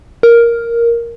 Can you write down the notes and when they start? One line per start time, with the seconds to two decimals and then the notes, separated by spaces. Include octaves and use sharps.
0.23 A#4